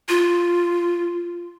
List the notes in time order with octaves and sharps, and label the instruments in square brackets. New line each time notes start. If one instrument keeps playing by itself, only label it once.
[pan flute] F4